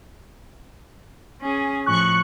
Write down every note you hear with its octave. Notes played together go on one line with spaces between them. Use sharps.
C#4 G#4
A2 F3 C#6 F#6